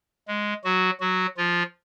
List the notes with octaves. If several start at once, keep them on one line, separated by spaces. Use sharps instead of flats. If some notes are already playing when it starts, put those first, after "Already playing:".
G#3
F#3 F#4
F#3 F#4
F3 F4